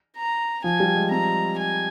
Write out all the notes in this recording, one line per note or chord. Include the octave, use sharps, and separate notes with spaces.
A#5
F3 G#5
G3
G#3
C4 A#5
G#5